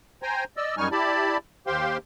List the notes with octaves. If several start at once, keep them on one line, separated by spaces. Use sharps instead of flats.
C5 G5 G#5 A#5
D5 D#5 E6
F#2 G3 D#4 G#5 C#6 F6
E4 G4 D5 A5 B5
D#2 G4 C5 F5 G5 C6